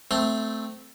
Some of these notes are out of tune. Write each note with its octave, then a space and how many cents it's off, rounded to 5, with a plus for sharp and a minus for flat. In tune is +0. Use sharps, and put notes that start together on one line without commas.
A3 +0 C4 -15 C6 +0